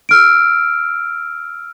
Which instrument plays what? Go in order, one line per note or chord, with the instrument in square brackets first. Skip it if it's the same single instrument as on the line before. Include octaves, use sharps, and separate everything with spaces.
[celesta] E6 F6 D7